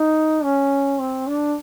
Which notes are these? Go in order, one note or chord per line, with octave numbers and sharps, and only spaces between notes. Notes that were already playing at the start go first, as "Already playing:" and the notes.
Already playing: D#4
C#4
C4
D4